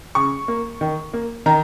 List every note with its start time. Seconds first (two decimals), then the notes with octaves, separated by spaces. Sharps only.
0.15 C#3 C#6
0.48 A#3
0.81 D#3
1.13 A#3
1.46 D#3 A#5